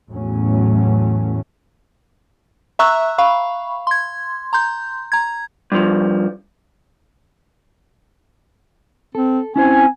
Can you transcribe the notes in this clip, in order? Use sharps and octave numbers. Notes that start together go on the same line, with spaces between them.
E2 A2 F#3 A3 C#4
E5 A#5 C#6 E6 F#6
F5 B5 C#6
C6 G#6
A#5 C6 G6
A#5 G#6
G2 F3
C4 A4
C4 C#4 E4 C5 G#5